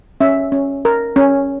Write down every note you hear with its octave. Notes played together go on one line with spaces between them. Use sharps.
C#4 E5
C#4
A#4
C#4